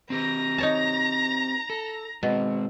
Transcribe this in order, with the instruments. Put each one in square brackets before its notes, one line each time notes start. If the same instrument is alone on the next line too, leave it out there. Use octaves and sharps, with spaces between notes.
[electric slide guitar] C4 G4 B4 [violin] A#5 A#6
[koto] D#4 C#5 A5
[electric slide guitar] A4
[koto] B2 [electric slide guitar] G#3 C4